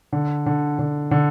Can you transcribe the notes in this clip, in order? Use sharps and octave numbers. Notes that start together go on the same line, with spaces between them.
D3
D3
D3
D3